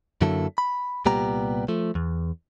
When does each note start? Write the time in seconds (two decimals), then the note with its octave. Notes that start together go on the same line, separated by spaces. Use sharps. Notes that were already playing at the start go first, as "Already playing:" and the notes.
0.21 F#2 D3 F#3 A#3 E4 A4
0.58 B5
1.06 C2 A#2 G3 B3 G4 A#5
1.68 F3 A3
1.95 E2